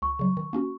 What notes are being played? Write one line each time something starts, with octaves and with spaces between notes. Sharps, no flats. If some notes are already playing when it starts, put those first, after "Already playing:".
C#2 C#6
C#3 F#3
D#3
A#3 C#4 F#4